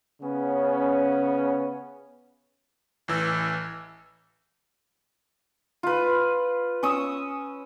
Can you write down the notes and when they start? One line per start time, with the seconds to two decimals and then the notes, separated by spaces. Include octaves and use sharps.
0.21 C#3 B3 C#4
3.08 A1 E3 E6
5.83 F4 B4
6.83 C#4 C#6 D#6 E6